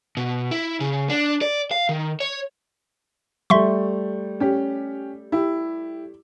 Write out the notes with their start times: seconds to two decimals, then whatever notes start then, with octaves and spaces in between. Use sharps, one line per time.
0.17 B2
0.51 E4
0.80 C#3
1.09 D4
1.42 D5
1.71 F5
1.89 D#3
2.20 C#5
3.50 G3 A3 E5 C6 C#6
4.40 C#4 G4
5.32 E4 G4